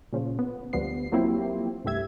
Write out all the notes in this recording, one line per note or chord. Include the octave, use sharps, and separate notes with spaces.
A#2 C#3 F3
B3
D2 F3 G3 B3 C7
F3 F#3 A#3 C4 E4 G4
C2 G2 A3 G4 E5 G#6